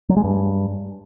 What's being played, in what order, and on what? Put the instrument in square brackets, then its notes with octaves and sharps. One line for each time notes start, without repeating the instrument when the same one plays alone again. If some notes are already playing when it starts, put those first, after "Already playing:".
[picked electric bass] F#3
G#3
G2